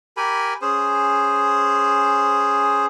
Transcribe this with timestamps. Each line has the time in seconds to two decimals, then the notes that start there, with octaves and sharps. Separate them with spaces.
0.17 G4 A#4 G#5 B5
0.62 C#4 G#4 C5